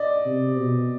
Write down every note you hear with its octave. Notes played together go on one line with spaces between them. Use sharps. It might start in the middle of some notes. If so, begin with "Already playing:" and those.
Already playing: D5 D#5
C3
B2